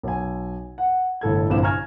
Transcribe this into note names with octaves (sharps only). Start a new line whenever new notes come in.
B1 G#5
F#5
G1 A2 A4 G#6
A#1 G2 D3 C4 E4 E7
G#5 A#5 C#6 F6 G#6